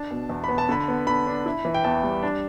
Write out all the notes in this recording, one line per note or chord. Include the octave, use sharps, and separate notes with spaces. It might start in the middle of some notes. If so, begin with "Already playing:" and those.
Already playing: D4 A5
B2
E2
B3 B5
A5
D3 B5
B3
D3 B5
D4
E4
E3
G5
E2 A5
G3
D4